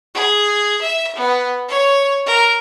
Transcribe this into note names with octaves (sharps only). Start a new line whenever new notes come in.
G#4
E5
B3
C#5
A#4